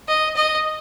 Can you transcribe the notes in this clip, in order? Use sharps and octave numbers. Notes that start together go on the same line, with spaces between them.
D#5
D#5